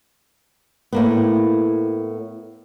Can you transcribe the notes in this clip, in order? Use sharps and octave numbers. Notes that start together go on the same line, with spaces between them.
A2 A#3 B3